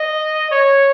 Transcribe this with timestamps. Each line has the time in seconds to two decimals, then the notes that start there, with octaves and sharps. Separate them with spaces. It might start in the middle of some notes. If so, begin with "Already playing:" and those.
Already playing: D#5
0.51 C#5